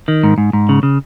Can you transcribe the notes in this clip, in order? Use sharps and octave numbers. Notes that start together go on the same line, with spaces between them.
D#3
G#2
G#2
G#2
C#3
C#3